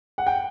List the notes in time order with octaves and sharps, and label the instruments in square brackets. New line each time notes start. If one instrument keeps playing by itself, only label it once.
[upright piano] F#5
G5